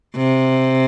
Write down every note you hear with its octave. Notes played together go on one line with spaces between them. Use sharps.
C3